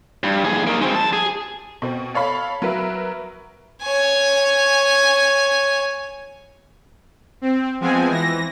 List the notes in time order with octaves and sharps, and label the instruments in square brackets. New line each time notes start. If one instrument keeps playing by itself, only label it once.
[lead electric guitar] G2
D#2 G#4
A#3 D#4
G#3 C4
F2 A5
G#4
[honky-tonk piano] B2 C4
A4 C#5 F5 B5
F#3 A#4 B4 E5
[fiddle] C#5 G#5
[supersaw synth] C4
F3 G#3 B3 C4 G#5
E3 A#6